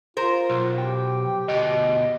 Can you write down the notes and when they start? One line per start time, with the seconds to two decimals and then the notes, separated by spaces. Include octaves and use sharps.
0.17 F4 A#4 C5
0.50 B1
0.78 G4 G5
1.48 D2 B2 D#5